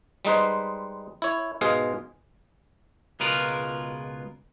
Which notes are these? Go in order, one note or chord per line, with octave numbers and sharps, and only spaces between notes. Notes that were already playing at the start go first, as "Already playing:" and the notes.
G3 G#3 D#4 B4 C5
E4 C#5
G#2 B2 G#3 G#4 F5
C#2 B2 G#3 F4 A#4 B4